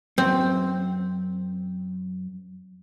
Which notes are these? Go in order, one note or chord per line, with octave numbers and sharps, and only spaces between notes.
F#2 C4